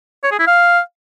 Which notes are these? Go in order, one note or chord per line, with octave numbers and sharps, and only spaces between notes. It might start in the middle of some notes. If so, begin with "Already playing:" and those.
C#5
G#4
E4
F5